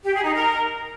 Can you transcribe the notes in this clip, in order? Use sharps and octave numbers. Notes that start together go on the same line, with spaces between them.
G4
G#4
D#4
A#4